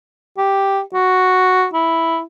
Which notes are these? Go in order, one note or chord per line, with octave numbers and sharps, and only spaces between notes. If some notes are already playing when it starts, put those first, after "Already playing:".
G4
F#4
E4